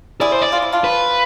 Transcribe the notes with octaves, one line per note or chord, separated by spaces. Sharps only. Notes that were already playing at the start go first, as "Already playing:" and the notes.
E4 G#4 D5
C5
D5
F4
E4
D4 F4
B4